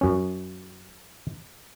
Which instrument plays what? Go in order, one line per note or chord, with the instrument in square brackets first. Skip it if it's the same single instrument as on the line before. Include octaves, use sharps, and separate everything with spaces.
[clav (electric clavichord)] F#2 C#4